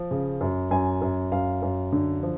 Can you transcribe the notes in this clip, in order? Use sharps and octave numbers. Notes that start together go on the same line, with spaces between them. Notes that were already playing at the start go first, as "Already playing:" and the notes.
Already playing: F3
C#3
F#2
F#2 G#5
F#2
F#2 F5
F#2
D3
F3